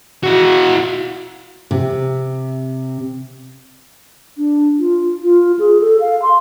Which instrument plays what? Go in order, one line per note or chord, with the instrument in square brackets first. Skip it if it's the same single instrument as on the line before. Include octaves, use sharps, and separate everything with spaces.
[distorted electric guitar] E4 F#4
[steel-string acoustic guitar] C3
[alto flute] D4
F4
F4
G#4
A4
F5
C6